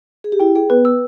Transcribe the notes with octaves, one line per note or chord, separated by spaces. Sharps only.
G#4
G4
E4 G5
G#4 G5
B3 B4
E6